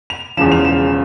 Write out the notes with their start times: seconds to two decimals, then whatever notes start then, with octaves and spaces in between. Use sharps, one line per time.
0.10 F7
0.37 E1 E2 C#3 F3 E7
0.52 F7
0.65 E7